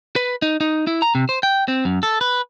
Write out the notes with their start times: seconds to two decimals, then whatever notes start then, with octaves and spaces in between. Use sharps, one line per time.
0.16 B4
0.42 D#4
0.61 D#4
0.87 E4
1.02 A#5
1.15 C3
1.29 C5
1.43 G5
1.68 C4
1.85 F#2
2.03 A4
2.21 B4